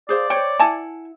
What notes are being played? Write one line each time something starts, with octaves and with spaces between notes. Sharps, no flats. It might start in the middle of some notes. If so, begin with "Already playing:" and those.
G#4 C5 D5 F5
C5 C#5 G5
E4 F#5 G#5 A5